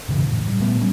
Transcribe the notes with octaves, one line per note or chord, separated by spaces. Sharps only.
F2 G#2 C#3 E3
A2
G3
A#2 F#3 A3 B3
G3 C#4